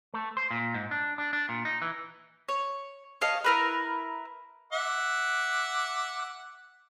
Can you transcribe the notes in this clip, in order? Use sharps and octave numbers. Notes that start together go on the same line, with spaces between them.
A3
C5
A#2
G#2
D4
D4
D4
A#2
D#4
E3
C#5
C#5 D#5 F5 A5
E4 A#4 B4
E5 F#5 D6